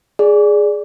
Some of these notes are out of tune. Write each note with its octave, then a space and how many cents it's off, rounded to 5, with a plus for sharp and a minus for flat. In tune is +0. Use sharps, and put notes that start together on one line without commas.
G#4 +0 D5 +0